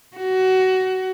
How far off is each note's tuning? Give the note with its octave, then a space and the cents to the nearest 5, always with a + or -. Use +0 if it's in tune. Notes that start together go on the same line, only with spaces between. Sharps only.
F#4 +20